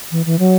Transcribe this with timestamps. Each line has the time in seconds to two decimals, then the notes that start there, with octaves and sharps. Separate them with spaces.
0.12 E3
0.26 E3
0.39 F#3